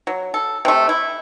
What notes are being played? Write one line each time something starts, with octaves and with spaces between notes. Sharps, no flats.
F#3
A4
C3 A3
E4